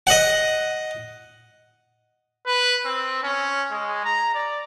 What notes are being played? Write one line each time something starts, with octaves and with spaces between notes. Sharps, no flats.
D#5 F#5
B4
C4
C#4
G#3
A#5
D5